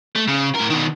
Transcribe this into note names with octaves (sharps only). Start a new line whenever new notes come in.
A3
C#3
A2 A#4
B2 D#3